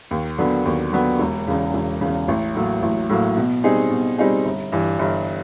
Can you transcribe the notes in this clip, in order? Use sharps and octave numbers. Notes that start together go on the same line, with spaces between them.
D#2
D3 F#3 B3
D#2
D3 F#3 B3
E1
E2 C#3
E1
E2 C#3
A1
A2 F#3 A#3
A1
A2 F#3 A#3
B2
G3 C4 D#4 G#4
B2
G3 C4 D#4 G#4
G1
G2 E3
G1